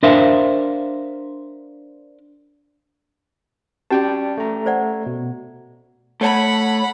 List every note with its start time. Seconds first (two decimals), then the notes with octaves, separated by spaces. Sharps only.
0.03 D4 A#4 C5 E5 F5
3.91 C#4 F#4 G4 D5 G5 A5
4.38 A3 A#5
4.66 C5 D5 F#5
5.06 B2
6.21 A3 C#5 F#5 B5